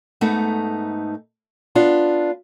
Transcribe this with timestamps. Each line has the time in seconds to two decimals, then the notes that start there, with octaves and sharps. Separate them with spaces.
0.21 G#2 A3 B3 D#4
1.75 B3 D4 F4